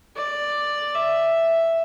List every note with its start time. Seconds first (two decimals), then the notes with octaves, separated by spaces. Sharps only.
0.16 D5
0.94 E5